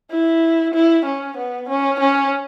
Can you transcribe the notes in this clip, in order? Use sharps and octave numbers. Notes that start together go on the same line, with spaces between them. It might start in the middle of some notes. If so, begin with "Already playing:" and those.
E4
E4
C#4
B3
C#4
C#4